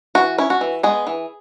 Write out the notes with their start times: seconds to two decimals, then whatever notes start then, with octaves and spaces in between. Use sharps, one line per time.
0.15 E3 F#4
0.38 C#4 E4
0.50 F#4
0.61 E3
0.83 G#3 B3 G#4
1.07 E3